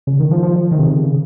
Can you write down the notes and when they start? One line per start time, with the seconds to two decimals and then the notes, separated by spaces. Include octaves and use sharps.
0.07 C#3
0.20 D#3
0.31 F3
0.43 F3
0.56 F3
0.71 D#3
0.79 C3
0.87 C#3
1.03 C#3